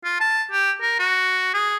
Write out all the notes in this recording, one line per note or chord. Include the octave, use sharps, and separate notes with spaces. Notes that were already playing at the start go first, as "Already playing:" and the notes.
F4
A5
G4
A#4
F#4
G#4